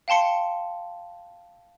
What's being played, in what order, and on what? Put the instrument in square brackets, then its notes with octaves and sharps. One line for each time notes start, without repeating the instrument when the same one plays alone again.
[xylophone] F5 G5 A5 C6 C#7